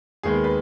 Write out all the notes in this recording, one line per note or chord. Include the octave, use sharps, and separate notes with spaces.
D#2 D#3 G#3 B3 G#4
A#4
B4